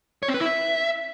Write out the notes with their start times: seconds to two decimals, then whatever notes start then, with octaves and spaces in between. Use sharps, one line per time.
0.23 C#5
0.28 C4
0.34 B4
0.40 E4
0.46 E5